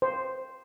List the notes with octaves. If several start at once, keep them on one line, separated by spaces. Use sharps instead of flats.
C5